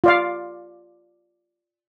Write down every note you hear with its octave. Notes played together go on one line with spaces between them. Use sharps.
F4 D5 F5